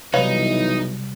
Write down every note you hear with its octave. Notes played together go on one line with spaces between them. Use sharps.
B1 C3 E3 G3 D#4 B4 C#5 F5